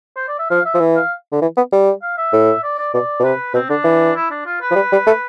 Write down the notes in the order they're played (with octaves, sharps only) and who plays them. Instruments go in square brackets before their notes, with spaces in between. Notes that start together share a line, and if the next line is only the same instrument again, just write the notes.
[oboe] C5
D5
E5
[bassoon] F3 [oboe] F5
[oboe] E5
[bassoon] F3
E3
[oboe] F5
[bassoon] D3
E3
B3
G3
[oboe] F5
E5
[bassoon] A2
[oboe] D5
D5
[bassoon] B2 [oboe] D5
[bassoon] B2
[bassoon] C3 [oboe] B4
[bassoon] B2 [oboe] C4
[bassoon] D3 [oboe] D4
[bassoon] E3
[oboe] E4
D4
F4
B4
[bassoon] F3
G3
G3
A3